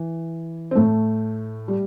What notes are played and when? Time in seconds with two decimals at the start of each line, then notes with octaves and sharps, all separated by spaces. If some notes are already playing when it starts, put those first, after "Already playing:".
Already playing: E3
0.71 C4
0.75 A2 A3
1.68 G3